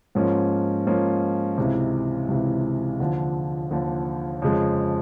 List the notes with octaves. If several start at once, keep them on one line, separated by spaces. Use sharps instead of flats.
G#2 F3 A#3 C#4
G#2 F3 A#3 C#4
C#2 C3 E3
C#2 C3 E3
D#2 D3 F3
D#2 D3 F3
F2 C#3 F3 G#3